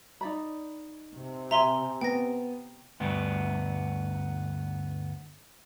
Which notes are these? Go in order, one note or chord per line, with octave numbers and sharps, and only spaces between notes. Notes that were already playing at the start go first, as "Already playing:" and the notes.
D#4 D5 B5
C3
E5 G#5 A#5 C6
B3 G5 A#6
D2 G2 B3